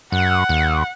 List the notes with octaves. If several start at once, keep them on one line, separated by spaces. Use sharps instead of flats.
F#2 F#5
D#2